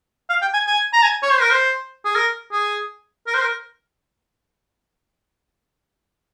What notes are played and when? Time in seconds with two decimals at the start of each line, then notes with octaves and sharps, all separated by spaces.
0.29 F5
0.41 G5
0.54 G#5
0.67 G#5
0.93 A#5
1.03 G#5
1.22 C#5
1.32 C5
1.41 A#4
1.51 C5
2.05 G#4
2.15 A#4
2.52 G#4
3.27 A#4
3.34 C5
3.42 A#4